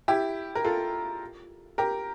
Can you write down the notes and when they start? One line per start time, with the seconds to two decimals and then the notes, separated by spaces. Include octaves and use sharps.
0.08 E4 G4
0.55 A#4
0.64 F4 A4
1.78 G4 A#4